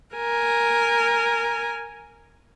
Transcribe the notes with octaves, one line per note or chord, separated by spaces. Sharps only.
A#4 G#5